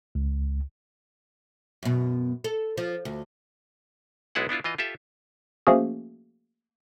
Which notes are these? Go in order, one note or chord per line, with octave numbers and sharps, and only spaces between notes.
C#2
F#2 B2
A4
F3
D2
B1 G#3 B3 E4 G#4 F#5
B3 D4 E4 F4
E3 F4 D#5
F4 G4 A4 E5
F3 A3 A#3 C#4 F#4 G#4